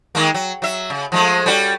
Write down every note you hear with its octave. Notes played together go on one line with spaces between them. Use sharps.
D#3 G#3 A#3
F#3
F#3 E5
C#3
F3 G#3 A3
G3 C#4 F#4